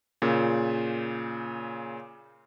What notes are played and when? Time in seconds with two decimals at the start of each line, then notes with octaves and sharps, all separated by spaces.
0.22 A#2 C#3